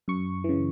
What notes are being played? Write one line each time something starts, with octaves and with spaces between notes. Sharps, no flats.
F#2 C#6
C#3 E3